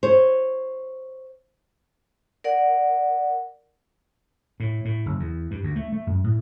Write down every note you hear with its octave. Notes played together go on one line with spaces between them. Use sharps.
C5 C#5
A#4 D5 F#5
A2
A2
F#1
E2
G2
D2
A3
A3
F#2
A2